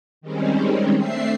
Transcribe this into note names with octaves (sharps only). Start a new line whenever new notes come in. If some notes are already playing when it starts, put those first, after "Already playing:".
D#3 G3 G#3 C4 C#4
A3 C4 D4 E5 C7